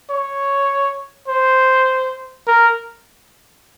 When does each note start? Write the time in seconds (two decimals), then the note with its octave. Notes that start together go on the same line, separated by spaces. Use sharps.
0.10 C#5
1.28 C5
2.47 A#4